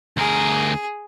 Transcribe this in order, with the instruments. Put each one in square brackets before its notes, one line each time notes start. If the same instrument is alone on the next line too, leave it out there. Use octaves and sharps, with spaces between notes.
[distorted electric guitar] D2 A#4 [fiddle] G#4